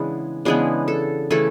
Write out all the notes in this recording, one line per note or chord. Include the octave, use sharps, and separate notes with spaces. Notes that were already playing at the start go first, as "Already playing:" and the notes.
Already playing: C#3 E3 G#3 B3 D4
C#3 E3 G#3 B3 D4
A4
C#3 E3 A3 A4